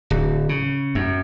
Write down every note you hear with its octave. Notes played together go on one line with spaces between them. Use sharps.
D1
C#3
F#2